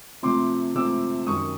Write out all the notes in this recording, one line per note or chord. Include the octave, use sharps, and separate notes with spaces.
C3 F3 A3 C4 C6 D6
C3 F3 A3 C4 D6 E6
F#2 D#3 G3 C#6 D#6